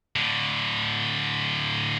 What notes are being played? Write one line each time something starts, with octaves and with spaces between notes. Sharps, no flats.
A2 D3